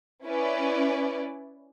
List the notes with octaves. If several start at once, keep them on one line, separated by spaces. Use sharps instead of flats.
C#4 E4 B4 D5